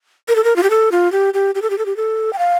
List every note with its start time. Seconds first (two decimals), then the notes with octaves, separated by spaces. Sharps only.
0.28 A#4
0.36 A4
0.44 A#4
0.56 F4
0.63 G4
0.70 A4
0.92 F4
1.12 G4
1.34 G4
1.55 G4
1.62 A4
1.70 G4
1.78 A4
1.86 G4
1.97 A4
2.33 G5
2.39 F5